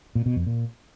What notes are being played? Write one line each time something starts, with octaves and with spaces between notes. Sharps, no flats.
A#2
B2
F2
A#2